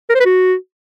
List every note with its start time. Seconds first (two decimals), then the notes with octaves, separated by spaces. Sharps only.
0.10 A#4
0.15 C5
0.20 B4
0.25 F#4